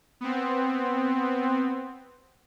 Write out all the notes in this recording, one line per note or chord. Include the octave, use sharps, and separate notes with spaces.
B3 C4